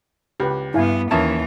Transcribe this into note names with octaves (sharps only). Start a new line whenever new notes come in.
C#2 G4 B4
G2 B3 E4 F5 G#5
D#2 E3 A#3 C#4 E5 A5 D#6